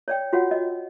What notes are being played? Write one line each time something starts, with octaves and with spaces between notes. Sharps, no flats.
C#5 D5 G5
F4 F#4 C#5 F#5
D#5